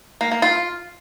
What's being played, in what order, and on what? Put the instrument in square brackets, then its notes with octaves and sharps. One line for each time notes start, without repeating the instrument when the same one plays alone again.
[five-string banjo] A#3
A#3
F4